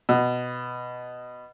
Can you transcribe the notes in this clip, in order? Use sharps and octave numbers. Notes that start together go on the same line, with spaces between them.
B2